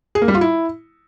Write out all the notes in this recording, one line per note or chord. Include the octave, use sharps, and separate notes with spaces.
G#4
A#3
G3
F4
E4